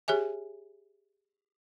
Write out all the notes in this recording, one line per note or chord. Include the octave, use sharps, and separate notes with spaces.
G4 G#4 C#5 E5 G#5